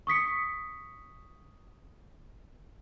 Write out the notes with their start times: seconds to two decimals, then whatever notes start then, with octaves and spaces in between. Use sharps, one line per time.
0.07 C#6 D#6 B6 C#7